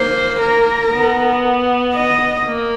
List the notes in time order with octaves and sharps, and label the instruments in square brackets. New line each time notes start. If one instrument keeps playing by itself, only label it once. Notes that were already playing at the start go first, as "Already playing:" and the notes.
Already playing: [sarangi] A#3 [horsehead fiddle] C5
[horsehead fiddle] A#4
[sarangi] B3
[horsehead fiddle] D#5
[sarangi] A#3